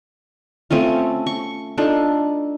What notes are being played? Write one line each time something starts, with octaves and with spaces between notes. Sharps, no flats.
A3 C4 C#4 F4
C#6
D4 D#4 F4 A4